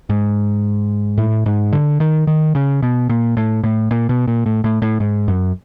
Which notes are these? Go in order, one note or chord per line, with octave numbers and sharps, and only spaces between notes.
G#2
A2
G#2
D3
D#3
D#3
C#3
B2
A#2
A2
A2
A#2
B2
A#2
A2
A2
A2
G#2
F#2